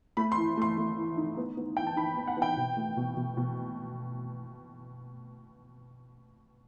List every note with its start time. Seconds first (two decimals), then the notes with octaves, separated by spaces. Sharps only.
0.17 A3 B5
0.32 C6
0.37 E3
0.57 A3 C6
0.78 A3
0.97 E3
1.17 D#4
1.37 B3
1.57 B3
1.77 E3 G5
1.87 A5
1.96 D#4 B5
2.17 B3
2.27 F#5
2.37 B3
2.42 G5
2.57 B2
2.77 A3
2.97 B2
3.17 B2
3.37 B2